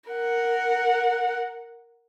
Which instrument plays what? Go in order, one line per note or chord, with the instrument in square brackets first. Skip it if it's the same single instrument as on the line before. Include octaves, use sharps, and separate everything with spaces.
[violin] A#4 F#5